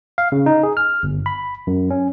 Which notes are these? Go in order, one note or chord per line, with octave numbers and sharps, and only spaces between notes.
F5
C#3
D#4
G#4
F6
G1
B5
F#2
C#4